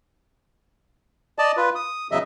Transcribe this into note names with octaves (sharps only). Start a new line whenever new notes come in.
D5 D#5 A5
F4 B4
D#6
E2 C#3 F#3 D#5 E5